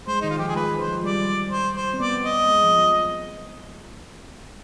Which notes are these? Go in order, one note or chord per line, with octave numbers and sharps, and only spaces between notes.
G#3 C5
D#3 D#4
F4
F3 G4
G#4
G#3 B4
C5
F3
G3 D5
C5
C5
C4
B3 D5
D#5
G#3
F3